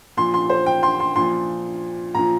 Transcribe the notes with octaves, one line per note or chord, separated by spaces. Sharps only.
A#2 F3 C6
C6
C5
G5
C6
C6
A#2 F3 C6
A#2 F3 A#5